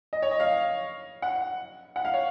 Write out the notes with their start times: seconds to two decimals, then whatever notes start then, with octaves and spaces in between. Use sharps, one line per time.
0.13 D#5
0.22 C#5
0.31 D#5
0.40 F5
1.22 F#5
1.96 F#5
2.05 F5
2.14 C#5